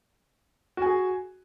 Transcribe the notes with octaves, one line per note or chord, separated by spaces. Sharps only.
F#4 G#4 G#5